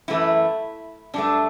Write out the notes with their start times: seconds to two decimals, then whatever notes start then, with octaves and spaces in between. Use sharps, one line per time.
0.08 F#2 E3 A3 E4
1.14 G2 F#3 A3 D4